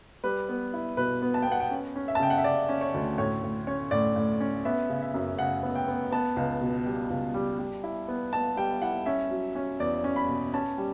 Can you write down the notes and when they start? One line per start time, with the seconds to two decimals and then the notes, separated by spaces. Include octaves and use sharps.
0.24 G3 B4
0.49 B3
0.74 E4
0.97 B2 B4
1.22 B3
1.34 A5
1.42 G5
1.47 B3 F#5
1.60 G5
1.71 C#4
1.96 C#4
2.08 E5
2.15 A5
2.20 C#3 G5
2.30 F#5
2.38 E5
2.44 C#3 D5
2.69 C#4
2.81 C#5
2.94 D2
3.18 A2 C#5
3.43 A2
3.67 C#4 C#5
3.91 A2 D5
4.16 A2
4.40 C#4
4.65 B3 E5
4.90 C#3
5.02 E5
5.14 F#2
5.39 C#3 F#5
5.63 B3
5.75 G5
5.88 B3
6.12 B3 A5
6.36 C#2
6.61 B2
6.86 G3
7.10 C#2
7.34 G3
7.59 G3
7.84 E4
8.08 B3
8.33 B3 A5
8.57 G3 G5
8.82 E4 F#5
9.06 C#4 E5
9.31 F#3
9.55 C#4
9.80 E2 D5
10.04 C#4
10.16 B5
10.29 B2
10.53 C#4 A5
10.78 G3